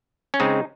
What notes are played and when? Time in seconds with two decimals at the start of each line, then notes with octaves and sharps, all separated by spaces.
0.34 C#4
0.40 C#3 G#3 C4 D#4